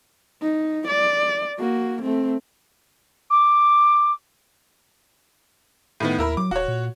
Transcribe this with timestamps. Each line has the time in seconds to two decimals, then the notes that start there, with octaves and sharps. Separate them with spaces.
0.42 D#4
0.88 D5
1.59 A#3 F#4
2.03 A3 C4
3.30 D6
6.00 A2 D#3 B3
6.19 D#2 E4 A#4 B5
6.37 F#3 D6
6.51 D#1 F#4 C#5
6.68 A#2